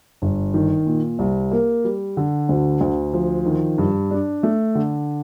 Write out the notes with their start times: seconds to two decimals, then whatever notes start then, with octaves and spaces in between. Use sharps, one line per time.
0.22 G1
0.54 D#3
0.87 A#2
1.19 C2
1.52 A#3
1.84 G3
2.17 D3
2.49 D2
2.81 D2
3.13 F3
3.46 D#3
3.78 G2
4.11 D4
4.43 A3
4.75 D3